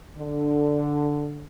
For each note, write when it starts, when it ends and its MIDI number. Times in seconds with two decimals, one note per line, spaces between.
0.18 1.47 50